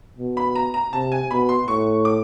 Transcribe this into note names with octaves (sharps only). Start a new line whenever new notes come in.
B2
B5
A#5
A#5
C3 A5
G#5
B2 B5
C6
A2 C#6
D6